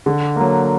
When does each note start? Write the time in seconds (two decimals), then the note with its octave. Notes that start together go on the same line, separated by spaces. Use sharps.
0.06 D3
0.36 F#3 A#3